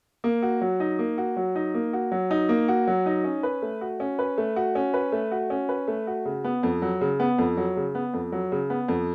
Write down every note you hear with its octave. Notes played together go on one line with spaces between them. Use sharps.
A#3
F#4
F#3
D#4
A#3
F#4
F#3
D#4
A#3
F#4
F#3
D#4
A#3
F#4
F#3
D#4
C#4
B4
A3
F#4
C#4
B4
A3
F#4
C#4
B4
A3
F#4
C#4
B4
A3
F#4
C#3
B3
F2
F#3
C#3
B3
F2
F#3
C#3
B3
F2
F#3
C#3
B3
F2